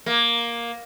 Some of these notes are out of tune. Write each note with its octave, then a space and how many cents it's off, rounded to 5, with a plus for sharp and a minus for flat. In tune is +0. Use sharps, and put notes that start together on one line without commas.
A#3 +10